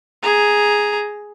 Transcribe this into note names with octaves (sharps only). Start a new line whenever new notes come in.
G#4 A#5